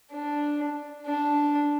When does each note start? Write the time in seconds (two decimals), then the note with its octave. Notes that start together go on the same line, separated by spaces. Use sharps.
0.12 D4
1.07 D4